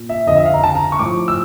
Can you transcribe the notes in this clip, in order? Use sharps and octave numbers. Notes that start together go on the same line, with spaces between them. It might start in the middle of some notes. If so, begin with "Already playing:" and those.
Already playing: A#2
E5
F2 D3 F3 D#5
E5
F5
A#5
A5
A#5
C#6
A2 F3 D6
E6